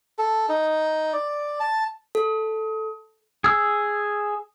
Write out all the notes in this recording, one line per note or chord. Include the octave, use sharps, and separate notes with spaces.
A4
D#4
D5
A5
A4
G#4 E6